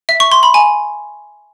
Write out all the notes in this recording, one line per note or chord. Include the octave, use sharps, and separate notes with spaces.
E5
C#6
C6
B5
G#5